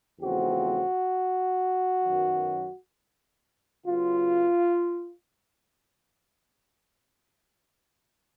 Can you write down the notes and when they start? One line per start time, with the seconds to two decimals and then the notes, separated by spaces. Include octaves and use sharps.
0.20 E2 C#3 F3 A3 C4 F#4
2.03 F#2 D#3 F#3 B3
3.85 C#3 F#3 B3 F4